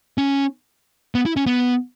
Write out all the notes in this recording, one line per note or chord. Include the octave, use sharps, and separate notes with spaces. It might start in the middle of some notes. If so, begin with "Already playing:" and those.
C#4
B3
E4
C#4
B3